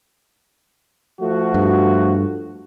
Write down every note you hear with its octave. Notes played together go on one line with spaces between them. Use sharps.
F3 A3 F#4
G2